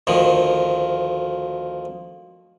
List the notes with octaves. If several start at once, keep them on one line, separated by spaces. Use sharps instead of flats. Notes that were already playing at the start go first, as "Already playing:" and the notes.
D2 D#3 F3